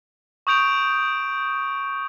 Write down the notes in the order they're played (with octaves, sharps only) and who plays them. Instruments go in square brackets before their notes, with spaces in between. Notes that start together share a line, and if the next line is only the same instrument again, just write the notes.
[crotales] C#6 D#6 G6 D7 F7